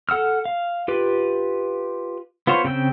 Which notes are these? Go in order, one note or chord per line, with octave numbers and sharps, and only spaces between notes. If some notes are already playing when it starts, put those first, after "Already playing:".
A4 F#5 E6 F6
F5
F4 G4 B4
B3 F4 C5 C#5
C#3 C4 G5 E6